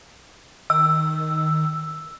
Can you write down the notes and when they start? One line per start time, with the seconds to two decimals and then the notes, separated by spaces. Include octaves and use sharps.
0.70 D#3 E6